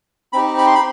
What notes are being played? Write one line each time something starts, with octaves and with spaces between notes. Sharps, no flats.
C4 D#4 G4 B5
B5
C6
B5